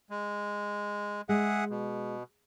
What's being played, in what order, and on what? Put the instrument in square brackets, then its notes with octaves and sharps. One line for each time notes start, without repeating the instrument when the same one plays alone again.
[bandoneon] G#3
[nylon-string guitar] G#3 [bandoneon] G#4 E5 F#5
[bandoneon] B2